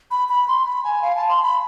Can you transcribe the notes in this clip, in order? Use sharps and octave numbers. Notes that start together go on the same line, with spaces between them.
B5
B5
C6
B5
G#5
F5
A5
C6
B5